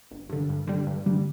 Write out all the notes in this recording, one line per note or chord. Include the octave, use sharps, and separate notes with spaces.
G1
G2 D3
G2
D3 G3
G2
D3 G3